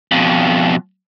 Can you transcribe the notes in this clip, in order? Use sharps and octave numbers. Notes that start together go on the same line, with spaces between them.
F2 B2